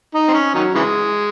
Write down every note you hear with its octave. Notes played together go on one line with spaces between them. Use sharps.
D#4
C4
C#4
D#3 F#3
C#3 E3 G#3